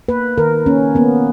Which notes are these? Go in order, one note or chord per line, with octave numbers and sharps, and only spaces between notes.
A#3 B4
D#3 A#4
A#3 C#4
A#3 B3